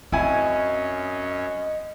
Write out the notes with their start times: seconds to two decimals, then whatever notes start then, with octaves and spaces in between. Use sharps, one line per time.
0.12 F#2 C4 C#4 E4 D#5 G#5